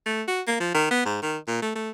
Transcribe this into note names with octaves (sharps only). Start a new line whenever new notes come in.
A3
F#4
A#3
F3
D#3
B3
G#2
D#3
A#2
A3
A3